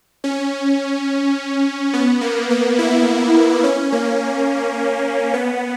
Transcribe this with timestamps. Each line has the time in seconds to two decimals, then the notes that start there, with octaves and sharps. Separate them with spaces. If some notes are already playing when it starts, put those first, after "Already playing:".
0.24 C#4
1.94 B3
2.21 A#3
2.51 A#3
2.79 E4
3.64 C#4
3.92 A#3
5.34 B3